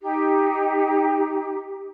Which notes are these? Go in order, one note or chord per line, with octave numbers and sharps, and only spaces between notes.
D#4 G4